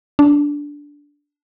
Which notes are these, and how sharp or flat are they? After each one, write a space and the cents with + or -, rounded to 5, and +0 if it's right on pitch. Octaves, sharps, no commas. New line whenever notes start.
D4 -10